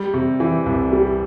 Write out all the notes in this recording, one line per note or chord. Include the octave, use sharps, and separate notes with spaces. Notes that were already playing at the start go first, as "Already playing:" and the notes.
Already playing: G3
C3
E3
C2
G3